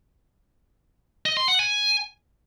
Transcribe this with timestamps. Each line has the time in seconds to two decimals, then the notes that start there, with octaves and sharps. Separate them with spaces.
1.26 D#5
1.37 C6
1.48 F#5
1.59 G#5